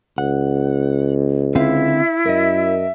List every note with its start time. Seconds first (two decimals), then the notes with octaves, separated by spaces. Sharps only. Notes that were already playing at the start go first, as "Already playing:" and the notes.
0.18 C#2 F#5
1.55 D3 C4 E4 E5 F5
2.26 F#2 A#4 D#5 E5